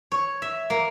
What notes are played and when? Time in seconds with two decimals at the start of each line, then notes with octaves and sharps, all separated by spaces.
0.12 C#5
0.42 E5
0.70 A#3